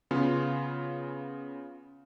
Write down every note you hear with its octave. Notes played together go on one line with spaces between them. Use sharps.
C#3 B3 C#4 F4